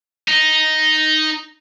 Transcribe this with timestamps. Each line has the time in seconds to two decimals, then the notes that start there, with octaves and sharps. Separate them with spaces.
0.28 D#4